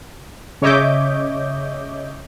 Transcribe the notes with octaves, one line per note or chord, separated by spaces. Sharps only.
C#3 C#5 D#5 E5 D6 G6